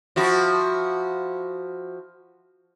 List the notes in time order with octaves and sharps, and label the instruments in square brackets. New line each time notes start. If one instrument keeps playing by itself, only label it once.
[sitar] F3 E4 F#4